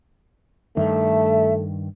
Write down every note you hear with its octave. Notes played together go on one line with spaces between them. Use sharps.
G2 D#3 A3 A4 E5